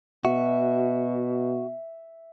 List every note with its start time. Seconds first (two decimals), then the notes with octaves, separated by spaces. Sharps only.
0.25 B2 F#4 E5